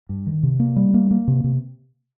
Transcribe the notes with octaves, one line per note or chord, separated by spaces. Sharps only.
G2
D#3
C3
A#3
G3
A#3
A#3
C3
C3